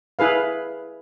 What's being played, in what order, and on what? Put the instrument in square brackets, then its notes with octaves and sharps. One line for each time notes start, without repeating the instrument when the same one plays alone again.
[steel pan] E4 G#4 B4 F5